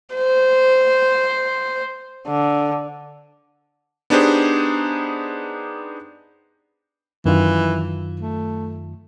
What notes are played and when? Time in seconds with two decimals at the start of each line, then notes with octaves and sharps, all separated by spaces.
0.15 C5
2.28 D3
4.10 B3 D4 D#4 G4 G#4 C5
7.26 F#2 D#3 E3 F4
8.20 A3